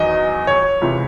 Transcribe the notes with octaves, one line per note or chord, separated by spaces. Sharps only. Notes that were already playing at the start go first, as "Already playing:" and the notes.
Already playing: E2 D#3 F#3 D#5
C#5
C#2 C3 E3